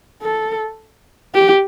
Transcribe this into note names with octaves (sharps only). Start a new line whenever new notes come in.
A4
G4